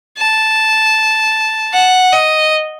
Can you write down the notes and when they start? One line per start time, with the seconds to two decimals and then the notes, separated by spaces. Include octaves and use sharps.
0.18 A5
1.73 F#5
2.12 D#5